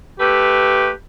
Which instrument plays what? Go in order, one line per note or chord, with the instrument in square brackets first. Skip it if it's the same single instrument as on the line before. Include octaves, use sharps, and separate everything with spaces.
[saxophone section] A3 B4 [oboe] G4